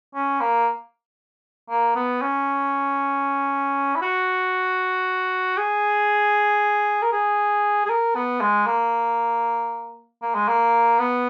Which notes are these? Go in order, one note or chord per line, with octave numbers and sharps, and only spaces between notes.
C#4
A#3
A#3
B3
C#4
E4
F#4
G#4
A#4
G#4
G#4
A#4
B3
G#3
A#3
A#3
G#3
A#3
B3